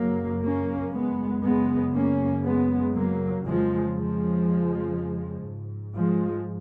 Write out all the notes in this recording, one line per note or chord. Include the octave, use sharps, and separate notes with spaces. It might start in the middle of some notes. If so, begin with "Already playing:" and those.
Already playing: F#2 C#3 F#3 A#3
A#3 C#4
G#3 B3
F#2 C#3 G#3 B3
A#3 C#4
G#3 B3
F#3 A#3
F2 C#3 F3 G#3
F3 G#3
G#2
F3 G#3